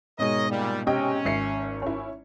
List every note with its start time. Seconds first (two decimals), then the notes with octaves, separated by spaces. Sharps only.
0.19 G#2 B2 G#3 A#4 C#5 D#5
0.50 A#2 G3
0.87 C3 C#4 D#5 G5
1.25 G#1 E5 C7 C#7
1.82 C#4 E4